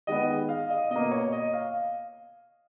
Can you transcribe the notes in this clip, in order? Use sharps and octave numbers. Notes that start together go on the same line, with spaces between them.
D#3 G#3 B3 D#5
F5
D#5
B2 A#3 D#5
C#5
D#5
F5